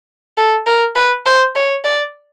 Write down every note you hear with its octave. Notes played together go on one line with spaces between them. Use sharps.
A4
A#4
B4
C5
C#5
D5